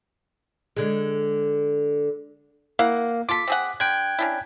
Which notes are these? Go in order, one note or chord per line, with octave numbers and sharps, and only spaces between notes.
D3 G#3
A#3 E4 F5 F#5
F4 A4 D6 B6
C4 G#4 F#5
D3 G5 F#6 G#6
C#4 D4 E4